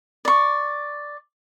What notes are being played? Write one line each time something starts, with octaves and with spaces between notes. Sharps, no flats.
D5 C#6